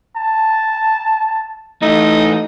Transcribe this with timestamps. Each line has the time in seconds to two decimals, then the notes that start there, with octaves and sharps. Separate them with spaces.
0.16 A5
1.82 E3 A3 D#4